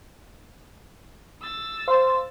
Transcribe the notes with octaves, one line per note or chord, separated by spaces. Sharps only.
E6 A6
C5 F5 C6